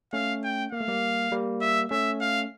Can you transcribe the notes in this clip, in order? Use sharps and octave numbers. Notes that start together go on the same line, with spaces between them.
A3 C#4 F5
G5
A#3 F5
A3
G3 A#3
G3 A#3
E5
A3 C#4 E5
F5